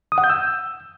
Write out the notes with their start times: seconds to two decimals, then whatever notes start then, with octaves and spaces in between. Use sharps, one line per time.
0.12 D#6
0.18 F#5
0.24 G6
0.29 E6